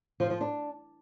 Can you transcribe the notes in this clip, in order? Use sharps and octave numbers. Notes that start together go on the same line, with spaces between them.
F3
F3
D4